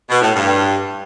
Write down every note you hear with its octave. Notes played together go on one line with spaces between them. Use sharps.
B2
A2
G2